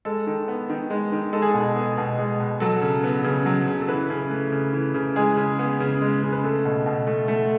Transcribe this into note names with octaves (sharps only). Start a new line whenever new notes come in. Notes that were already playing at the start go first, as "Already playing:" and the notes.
G#3 A4
D#3
B3
D#3
G#3
D#3
G#3 A4
G#4
B2 A4
B3
B2
G#3
B2
F#3 A4
C#3
B3
C#3
F#3
C#3
A4
E3 B4
C#3
A3
C#3
E3
C#3
G#3 G#4
C#3
B3
C#3
G#3
C#3
B4
A3 A4
B2
B2
A3
A3